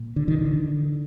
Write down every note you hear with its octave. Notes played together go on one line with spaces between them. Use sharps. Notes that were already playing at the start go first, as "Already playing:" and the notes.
Already playing: A#2
D3
D#3
D3